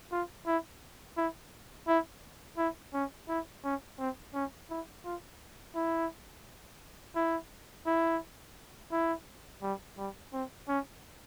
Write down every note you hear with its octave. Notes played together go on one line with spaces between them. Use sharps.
F4
E4
E4
E4
E4
C#4
E4
C#4
C4
C#4
E4
F4
E4
E4
E4
E4
G3
G3
C4
C#4